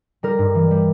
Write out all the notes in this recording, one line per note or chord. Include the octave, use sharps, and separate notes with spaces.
G3 A#4
G2
E3
G3